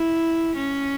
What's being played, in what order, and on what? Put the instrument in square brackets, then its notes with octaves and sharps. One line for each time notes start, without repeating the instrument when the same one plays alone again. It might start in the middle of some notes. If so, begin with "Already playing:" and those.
Already playing: [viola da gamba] E4
C#4